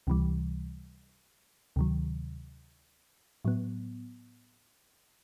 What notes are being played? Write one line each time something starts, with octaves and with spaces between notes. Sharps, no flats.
C#2 C3 E3 G3
D2 C3 D#3 F#3
A2 F#3 B3